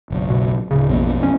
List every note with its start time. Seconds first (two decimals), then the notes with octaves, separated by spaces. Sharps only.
0.10 F#1 B1
0.30 B2
0.71 D1 C#3
0.89 A#1 F2 B2 A#3
1.23 C#4